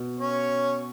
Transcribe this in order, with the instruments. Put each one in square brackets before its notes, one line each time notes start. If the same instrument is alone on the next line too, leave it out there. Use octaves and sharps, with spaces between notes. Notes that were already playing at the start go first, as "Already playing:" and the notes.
Already playing: [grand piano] B2
[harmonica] C#4 C#5